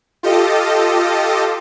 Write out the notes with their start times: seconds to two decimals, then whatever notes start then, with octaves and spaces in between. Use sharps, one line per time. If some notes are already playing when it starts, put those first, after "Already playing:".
0.23 F4 G4 A4 D#5